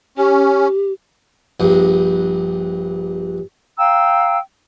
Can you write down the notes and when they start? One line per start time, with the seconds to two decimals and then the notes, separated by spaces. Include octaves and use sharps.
0.17 C#4 G4
1.60 A#1 G2
3.78 F5 G5 A#5 E6